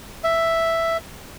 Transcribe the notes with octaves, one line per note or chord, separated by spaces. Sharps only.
E5